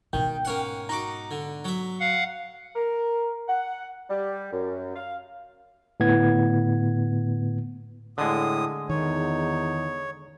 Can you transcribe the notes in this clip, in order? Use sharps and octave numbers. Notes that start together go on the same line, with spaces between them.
G#2 B2 D#3 G5
A#3 C#4 F#5
D#4 F#4 A#5 D6
D3
F#3 E5
F5 F#5
A#4
F#5
G3
F#2
F5
A2 D3 B3 G#6
A2 D3 G#3 D#6
E2 D#3 D#4 C#5